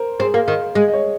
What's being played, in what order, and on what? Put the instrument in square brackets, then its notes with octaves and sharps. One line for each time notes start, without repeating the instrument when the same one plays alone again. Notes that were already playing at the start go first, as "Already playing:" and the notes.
Already playing: [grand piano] A#4 C5
[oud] C4 [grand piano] G#4
[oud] A#3
D#3
[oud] G#3 [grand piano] G#4
[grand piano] D#5
C#5